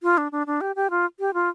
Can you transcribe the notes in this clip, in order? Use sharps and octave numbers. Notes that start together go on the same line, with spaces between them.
F4
D4
D4
D4
G4
G4
F4
G4
F4